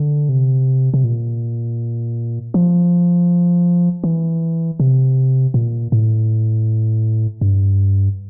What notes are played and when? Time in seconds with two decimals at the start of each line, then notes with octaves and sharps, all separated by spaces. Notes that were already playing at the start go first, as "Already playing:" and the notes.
Already playing: D3
0.29 C3
0.94 C3
1.04 A#2
2.54 F3
4.04 E3
4.80 C3
5.54 A#2
5.92 A2
7.41 G2